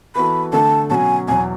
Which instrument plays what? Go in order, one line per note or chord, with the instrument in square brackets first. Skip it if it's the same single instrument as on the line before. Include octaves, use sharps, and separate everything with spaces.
[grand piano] E3 B3 F#4 A4 [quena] B5
[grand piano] D3 A3 D4 A4 [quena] A5
[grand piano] B2 F#3 C#4 F#4 [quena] G#5 A5
[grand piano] E2 B2 F#3 [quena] G#5